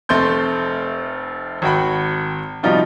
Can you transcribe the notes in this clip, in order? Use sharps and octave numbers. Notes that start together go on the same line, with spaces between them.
F1 A3 C4 C6 G6
G#1 F#4 G5 B5
C3 F3 G3 D#4 F4 F#4